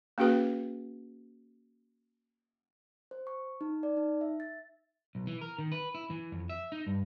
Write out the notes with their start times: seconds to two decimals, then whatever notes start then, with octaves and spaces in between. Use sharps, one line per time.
0.18 A#3 C#4 F#4 G#4 B4
3.11 C5
3.27 C#6
3.61 D#4
3.83 D5
3.97 D#4
4.21 E5
4.40 A6
5.15 B1
5.27 E3
5.41 A#4
5.58 D#3
5.72 B4
5.95 E4
6.10 E3
6.32 F2
6.49 E5
6.72 D#4
6.87 G2